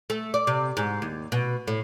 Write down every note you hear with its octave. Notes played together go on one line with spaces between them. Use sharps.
A3
D5
C3
G#2
D#2
B2
A2